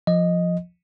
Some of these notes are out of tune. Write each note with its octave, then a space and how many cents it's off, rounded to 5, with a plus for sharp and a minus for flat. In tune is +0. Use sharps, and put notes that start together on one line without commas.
F3 +0 D#5 +0